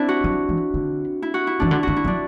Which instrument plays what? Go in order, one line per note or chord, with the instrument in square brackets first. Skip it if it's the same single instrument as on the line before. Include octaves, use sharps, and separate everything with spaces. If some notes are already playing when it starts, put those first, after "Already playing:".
Already playing: [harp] C4 D4 E4
F#4
[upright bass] F#3
E3
D3
[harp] E4
F#4
E4
[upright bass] E3 [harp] D4
[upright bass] D3 [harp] E4
[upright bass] D3 [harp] F#4
[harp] E4
[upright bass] F#3
[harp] D4